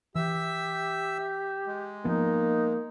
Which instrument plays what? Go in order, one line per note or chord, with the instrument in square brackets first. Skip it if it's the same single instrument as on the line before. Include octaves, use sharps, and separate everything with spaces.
[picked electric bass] E3 [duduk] G4 [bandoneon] E5 E6
[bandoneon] G#3
[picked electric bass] F3 B3 [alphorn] A#3 [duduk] D#4